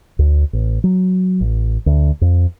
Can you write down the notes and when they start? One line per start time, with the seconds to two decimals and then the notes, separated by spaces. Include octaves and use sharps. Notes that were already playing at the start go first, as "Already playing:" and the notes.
0.19 D2
0.53 A1
0.84 F#3
1.41 A1
1.86 D2
2.21 F2